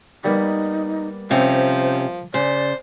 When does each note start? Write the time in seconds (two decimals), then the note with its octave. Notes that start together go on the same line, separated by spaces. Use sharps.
0.24 G3 A#3 B3 D#4
1.31 C3 F3 C#4 C5
2.34 C#3 C5 D5